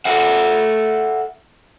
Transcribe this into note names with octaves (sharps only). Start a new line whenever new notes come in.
A4 E5 F#5